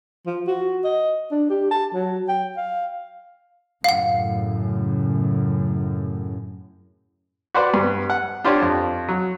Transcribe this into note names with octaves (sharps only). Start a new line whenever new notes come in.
F3
F#4
D#5
D4
G4
A5
F#3
G5
F5
F#2 A2 C#3 F5 F#5
F#4 B4 C5 D5 F#5
G2
F#5
D4 F4 G4 C5 C#5
F2
F#3